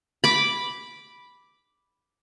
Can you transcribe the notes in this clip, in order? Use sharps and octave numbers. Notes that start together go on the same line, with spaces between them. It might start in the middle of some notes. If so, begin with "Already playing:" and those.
B5 D6